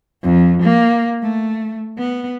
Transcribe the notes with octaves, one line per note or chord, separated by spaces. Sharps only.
F2
A#3
A3
B3